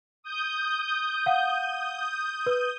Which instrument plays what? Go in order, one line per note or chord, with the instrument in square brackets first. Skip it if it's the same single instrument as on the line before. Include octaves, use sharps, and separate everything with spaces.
[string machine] D#6 G6
[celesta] F5 F#5
B4